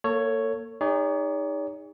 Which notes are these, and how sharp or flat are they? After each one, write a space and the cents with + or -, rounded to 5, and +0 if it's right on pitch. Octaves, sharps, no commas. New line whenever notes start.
A#3 +0 A4 +35 C#5 +0
D#4 +0 G#4 -35 C#5 +40